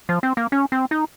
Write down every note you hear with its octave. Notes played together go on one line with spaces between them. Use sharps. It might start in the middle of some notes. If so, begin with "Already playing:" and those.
F3
C4
A#3
C#4
C4
D#4